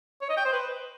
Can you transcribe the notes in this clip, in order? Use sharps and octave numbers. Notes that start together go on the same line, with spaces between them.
C#5
D#5
G5
C5
B4